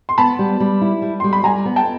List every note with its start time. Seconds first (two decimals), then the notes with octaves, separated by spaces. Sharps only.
0.09 C6
0.18 B3 A5 B5
0.39 G3
0.60 G3
0.81 E4
1.02 G3
1.20 G3 C6
1.33 B5
1.44 G3 G#5 A#5
1.65 B3
1.76 G5 A5